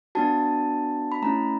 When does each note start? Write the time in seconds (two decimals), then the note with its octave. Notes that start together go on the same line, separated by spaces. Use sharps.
0.15 B3 D4 F#4 A5
1.12 B5
1.22 A3 C#4 E4 A#5